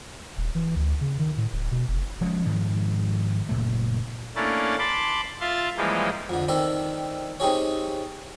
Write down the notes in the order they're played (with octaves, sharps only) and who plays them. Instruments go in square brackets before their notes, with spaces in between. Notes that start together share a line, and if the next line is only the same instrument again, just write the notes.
[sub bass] D#1
E3
D2
C#3
D#3
A2
D1
B2
F1
[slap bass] F3 G#3 C#4
G#2 D#3 F3
F#1 A#2 A3
[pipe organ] A3 A#3 C#4 D4 E4 A5
A5 B5 C6 D6
F4 E5 C6 A6
E3 F3 G3 G#3 A#3
[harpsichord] F2 D3
D#3 C4 A4 D5
C4 D#4 G4 G#4 C#5